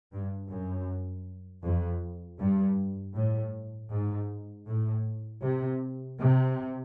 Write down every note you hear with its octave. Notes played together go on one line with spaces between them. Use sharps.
G2
F#2
F2
G2
A2
G#2
A2
C3
C3